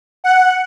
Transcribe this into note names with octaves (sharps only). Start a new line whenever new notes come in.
F#5